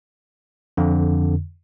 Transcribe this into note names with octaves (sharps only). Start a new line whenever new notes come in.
F2 D3